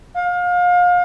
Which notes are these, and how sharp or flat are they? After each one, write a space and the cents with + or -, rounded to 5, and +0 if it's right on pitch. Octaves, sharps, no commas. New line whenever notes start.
F5 +30